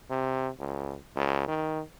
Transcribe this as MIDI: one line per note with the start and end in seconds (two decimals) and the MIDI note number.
0.10 0.48 48
0.59 0.95 37
1.16 1.43 37
1.48 1.80 51